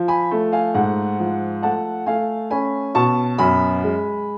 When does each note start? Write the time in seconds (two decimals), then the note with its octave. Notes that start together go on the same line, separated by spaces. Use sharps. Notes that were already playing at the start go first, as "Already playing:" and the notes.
Already playing: F3
0.08 G#5 B5
0.31 A3
0.52 F5 G#5
0.74 G#2 F#5
1.19 F3
1.63 A3 F#5 A5
2.06 A3 F5 G#5
2.51 C#4 G#5 B5
2.95 B2 A5 C#6
3.38 F#2 G#5 B5
3.84 G#3